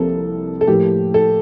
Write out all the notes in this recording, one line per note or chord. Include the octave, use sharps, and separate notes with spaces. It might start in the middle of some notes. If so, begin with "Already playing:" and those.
Already playing: C2 C3 F3 A#3 A4
A4
A2 F3 A#3 G4
A4